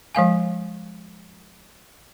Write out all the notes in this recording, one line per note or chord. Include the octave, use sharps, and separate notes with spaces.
F3 G#3 F5 G#5